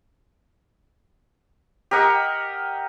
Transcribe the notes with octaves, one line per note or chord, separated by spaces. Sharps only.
G4 A#4 D#5 F#5